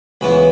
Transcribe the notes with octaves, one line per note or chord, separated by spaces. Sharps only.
C#2 C#3 E3 B3 E4 B5